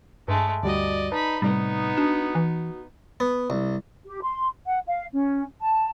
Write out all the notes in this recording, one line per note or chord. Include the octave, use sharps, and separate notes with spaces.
G2 G#3 A3
D2 G3 F#4 D5 D#5
D#4 B4 A5 B5
A2 C3 G3 B3 D#4
D4 F#4
E3
B3
C2
G4
C6
F#5
F5
C#4
A5